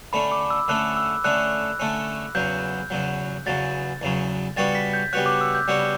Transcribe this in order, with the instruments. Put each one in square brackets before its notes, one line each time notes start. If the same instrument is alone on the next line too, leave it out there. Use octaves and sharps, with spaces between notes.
[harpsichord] D3 A3 C#4 [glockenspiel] B5
[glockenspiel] D6
E6
[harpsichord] D3 A3 C#4 [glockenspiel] F#6
[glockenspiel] E6
[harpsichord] D3 A3 C#4 [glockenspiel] F#6
[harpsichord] D3 A3 C#4
[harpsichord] E2 C#3 F#3 [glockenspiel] G6
[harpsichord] E2 C#3 F#3
[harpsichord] E2 C#3 F#3 [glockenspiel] A6
[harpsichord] E2 C#3 F#3
[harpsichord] C#3 G3 B3 F#4 C#5 [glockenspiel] A6
[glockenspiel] B6
G6
[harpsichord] C#3 G3 B3 F#4 C#5 [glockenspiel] F#6
[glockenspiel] D6
E6
G6
[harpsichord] C#3 G3 B3 F#4 C#5